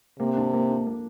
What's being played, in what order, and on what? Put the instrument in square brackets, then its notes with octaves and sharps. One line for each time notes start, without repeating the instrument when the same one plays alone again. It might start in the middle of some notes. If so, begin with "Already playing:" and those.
[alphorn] C3 [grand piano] A#3
[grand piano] D4
A#3
D4
A#3